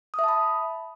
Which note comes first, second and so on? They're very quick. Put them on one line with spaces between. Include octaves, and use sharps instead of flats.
D#6 E5 A5 B5